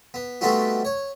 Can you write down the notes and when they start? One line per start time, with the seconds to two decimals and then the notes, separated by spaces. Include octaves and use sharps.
0.14 B3
0.41 G3 A3 B3 C4 D#4 F#4
0.85 C#5